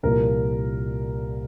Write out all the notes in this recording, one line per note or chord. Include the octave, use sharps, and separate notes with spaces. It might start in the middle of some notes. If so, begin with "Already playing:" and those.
C2 A#2 F3 A#4